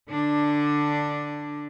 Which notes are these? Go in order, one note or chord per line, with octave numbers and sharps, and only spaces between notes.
D3 D4